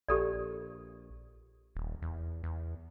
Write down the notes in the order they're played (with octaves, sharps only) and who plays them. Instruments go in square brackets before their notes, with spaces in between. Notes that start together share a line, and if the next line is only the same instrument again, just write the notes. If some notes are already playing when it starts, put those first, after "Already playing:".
[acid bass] A#1 [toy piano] G4 A4 D5
[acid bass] D#1
E2
E2